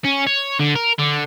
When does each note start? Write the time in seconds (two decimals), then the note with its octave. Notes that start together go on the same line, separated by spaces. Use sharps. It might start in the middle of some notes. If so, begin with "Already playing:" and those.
0.05 C#4
0.27 C#5
0.59 D3
0.76 A#4
0.99 D3